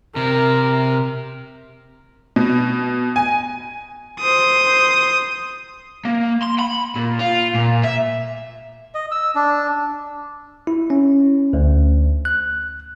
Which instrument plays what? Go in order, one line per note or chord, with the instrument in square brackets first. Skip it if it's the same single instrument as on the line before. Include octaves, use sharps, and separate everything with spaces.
[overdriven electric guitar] C3 [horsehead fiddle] A#4
[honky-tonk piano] B2
G#5
[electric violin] C5 D#6
[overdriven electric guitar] A#3
C6
B5
A#2
F4
A#2
E5
[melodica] D#5
E6
D4
[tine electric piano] E4
C#4
D2
F#6